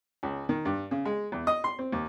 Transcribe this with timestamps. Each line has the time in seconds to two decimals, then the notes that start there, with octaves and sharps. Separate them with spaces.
0.23 C#2
0.49 D#3
0.65 G2
0.91 C#3
1.05 G#3
1.32 E2
1.47 D#5
1.64 C6
1.79 C4
1.92 D#2